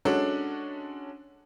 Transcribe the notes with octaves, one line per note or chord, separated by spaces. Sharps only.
G#3 C#4 D4 F#4 A4